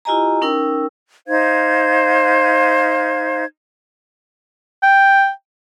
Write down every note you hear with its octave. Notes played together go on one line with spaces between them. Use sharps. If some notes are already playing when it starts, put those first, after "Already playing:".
E4 F4 G4 D#5 G#5 A#5
C#4 D#4 A#4 G5 E6
D#4 C5 F5 G#6
G5